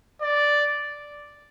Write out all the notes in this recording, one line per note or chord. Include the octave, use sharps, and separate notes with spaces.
D5